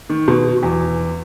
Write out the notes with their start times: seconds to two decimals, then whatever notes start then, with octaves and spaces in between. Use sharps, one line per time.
0.10 D#3
0.28 B2
0.63 E2